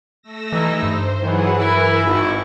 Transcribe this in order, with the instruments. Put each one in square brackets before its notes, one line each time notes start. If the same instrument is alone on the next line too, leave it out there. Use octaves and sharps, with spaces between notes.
[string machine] A3 E6 A#6
[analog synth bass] E3 [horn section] G3 D#4 E4
[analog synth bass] G2 [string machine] C5
[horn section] D#3 [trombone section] E3 [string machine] F#3 G#4 F#5
[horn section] E4 [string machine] A#4
[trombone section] G#1 [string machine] C#6